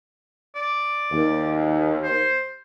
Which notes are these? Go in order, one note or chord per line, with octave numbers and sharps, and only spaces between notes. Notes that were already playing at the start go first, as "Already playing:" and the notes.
D5
D#2
C5